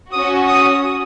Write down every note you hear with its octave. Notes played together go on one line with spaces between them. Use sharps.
C#4 F#4 D#6
D#6